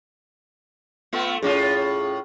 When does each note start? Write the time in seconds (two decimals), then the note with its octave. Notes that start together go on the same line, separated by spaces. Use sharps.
1.13 A3 B3 F4
1.42 A2 C#4 F4 G#4